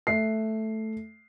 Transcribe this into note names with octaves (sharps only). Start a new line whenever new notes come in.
A3 E5 C7